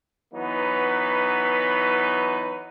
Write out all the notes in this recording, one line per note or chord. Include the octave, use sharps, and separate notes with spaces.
E3 F#3 B3 D#4 B4